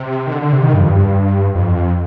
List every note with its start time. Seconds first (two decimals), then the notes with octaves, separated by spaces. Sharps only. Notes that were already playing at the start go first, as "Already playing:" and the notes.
Already playing: C3
0.27 D#3
0.32 D3
0.42 D3
0.53 C3
0.63 D#3
0.74 G2
0.81 F2
0.89 G2
1.55 F2